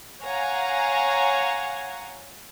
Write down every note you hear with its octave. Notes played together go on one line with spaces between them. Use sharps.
C#5 F5 F#5 G#5 A#5